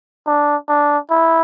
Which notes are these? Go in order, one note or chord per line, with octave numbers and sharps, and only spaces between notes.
D4
D4
E4